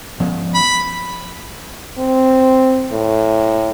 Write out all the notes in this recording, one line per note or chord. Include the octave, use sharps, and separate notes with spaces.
F3 B3 C#4
B5
C4
A2